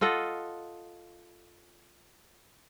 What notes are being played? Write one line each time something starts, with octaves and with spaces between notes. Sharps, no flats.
F4 A4 D#5 F#5